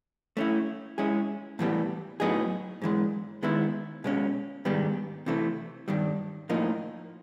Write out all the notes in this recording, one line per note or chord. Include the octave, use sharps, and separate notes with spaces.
A3 C#4 E4
G#3 C#4 E4 G#4
A2 E3 G3 B3
A2 F#3 B3 D#4 G#4
G#2 E3 G#3
D#3 G#3 B3 E4
B2 G#3 C#4
G#2 D#3 G3 B3
C3 E3 A3
G2 D#3 G3
A2 F3 A#3 D#4